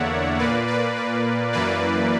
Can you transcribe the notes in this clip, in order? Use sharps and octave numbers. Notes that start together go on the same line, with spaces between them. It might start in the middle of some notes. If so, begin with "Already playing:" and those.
Already playing: E2 D3 A#3 C#5 D5 E5 F#5
A#2 A#3 B4 D5
B4 D5
B4
F#2 E3 A#3 B4 D5